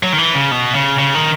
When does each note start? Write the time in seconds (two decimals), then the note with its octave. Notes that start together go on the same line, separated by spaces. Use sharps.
0.03 F#3
0.13 D#3
0.18 E3
0.34 C#3
0.51 B2
0.75 C#3
0.99 C#3
1.14 D#3